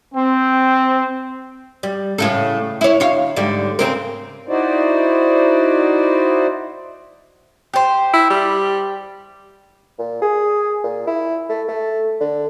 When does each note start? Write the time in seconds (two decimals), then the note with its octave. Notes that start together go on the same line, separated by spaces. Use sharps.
0.14 C4
1.83 G3
2.18 A2 C#3 A4
2.81 E4 C#5
3.00 D2 C#5 F5
3.36 G#2 D3 G3
3.79 C#3 C4 A#4
4.48 D#4 E4 F#4 C5 D5
7.74 G4 C5
8.13 E4
8.30 G3
9.99 A#2
10.22 G#4
10.84 A#2
11.07 E4
11.49 A3
11.69 A3
12.21 D3